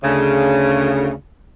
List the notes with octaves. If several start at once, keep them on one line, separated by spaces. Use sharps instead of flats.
D2 C#3